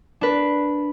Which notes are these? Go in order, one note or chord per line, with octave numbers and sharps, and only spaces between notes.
D4 B4